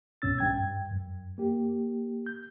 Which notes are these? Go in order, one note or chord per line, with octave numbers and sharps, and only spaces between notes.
C2 G2 B2 C#4 E6 A6
G2 G5 G#6
F#2
A#3 G4
G6